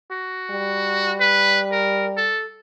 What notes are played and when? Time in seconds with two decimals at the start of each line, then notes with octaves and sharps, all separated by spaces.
0.12 F#4
0.51 G3
1.20 B4
1.72 A#4
2.17 A4